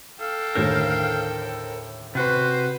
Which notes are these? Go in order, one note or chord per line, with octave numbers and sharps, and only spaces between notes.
A4 F5 G5
D#2 A2 D3 A#4 C5
C3 F#4 B4 C5